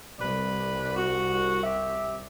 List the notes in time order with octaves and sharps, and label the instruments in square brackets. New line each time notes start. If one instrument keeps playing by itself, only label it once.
[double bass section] C2 [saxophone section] B4 D5
[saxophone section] F#4
G4 E5